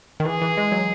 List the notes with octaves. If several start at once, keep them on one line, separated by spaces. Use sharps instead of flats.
D#3
E3 G#4
E3
G#3
F#3